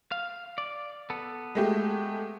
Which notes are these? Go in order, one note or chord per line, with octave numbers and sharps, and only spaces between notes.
F5
D5
B3 A4
G#3 A3 G4